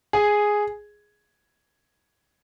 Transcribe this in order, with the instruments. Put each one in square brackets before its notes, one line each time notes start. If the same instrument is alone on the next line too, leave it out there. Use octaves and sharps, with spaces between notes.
[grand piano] G#4